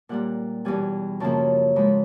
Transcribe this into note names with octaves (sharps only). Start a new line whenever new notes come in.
A#2 G3 A#3 F#5
E2 B2 G3 B3 G#5
F#2 C#3 F3 A#3 A5
G#2 F3 G#3 B5